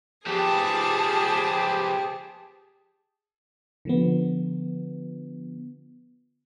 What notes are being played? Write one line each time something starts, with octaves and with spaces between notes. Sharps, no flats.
F3 B3 G4 G#4 A5
D3 F3 B3